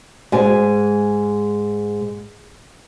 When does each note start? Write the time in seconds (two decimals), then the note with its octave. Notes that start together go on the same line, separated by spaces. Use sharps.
0.32 G#2 G#5